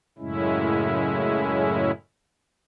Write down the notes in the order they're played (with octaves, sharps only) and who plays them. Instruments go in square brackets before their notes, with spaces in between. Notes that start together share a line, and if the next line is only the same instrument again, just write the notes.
[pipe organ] F#2 A2 C#3 G#3 C#4 E4